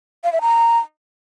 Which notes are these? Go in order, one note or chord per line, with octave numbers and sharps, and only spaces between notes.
F5
E5
A#5